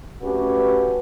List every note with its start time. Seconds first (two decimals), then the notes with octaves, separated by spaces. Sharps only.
0.22 A3 C#4 F#4 G4 B4